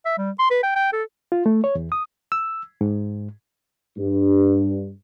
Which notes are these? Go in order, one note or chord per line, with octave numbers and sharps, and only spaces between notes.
E5
G3
C6
B4
G5
G5
A4
F4
A3
C#5
E2
D#6
E6
G#2
G2